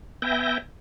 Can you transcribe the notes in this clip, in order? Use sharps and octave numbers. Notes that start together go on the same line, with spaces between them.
B3 E5 G5 G#5 G6 A#6